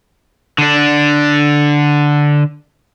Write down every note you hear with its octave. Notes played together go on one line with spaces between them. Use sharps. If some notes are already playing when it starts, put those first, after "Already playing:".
D3 D4